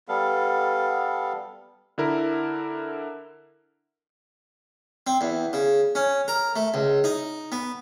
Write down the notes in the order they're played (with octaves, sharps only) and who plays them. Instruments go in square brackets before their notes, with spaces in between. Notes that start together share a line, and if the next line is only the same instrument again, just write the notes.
[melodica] G3 B3 A4 F5
[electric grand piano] D3 E4 A#4
[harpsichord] C4
E2
C#3
C#4
A#4
A3
C#2
D#4
B3